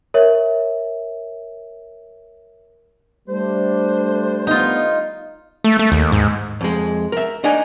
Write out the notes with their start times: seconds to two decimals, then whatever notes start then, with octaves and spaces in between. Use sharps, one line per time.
0.14 A#4 C#5 E5
3.28 G3 A3 D4 C5
4.47 B3 D#4 F4
5.64 A3
5.79 A3
5.92 D#2
6.12 G#2
6.61 F2 G#3
7.12 A#4 E5
7.44 D4 D#4 D5 G#5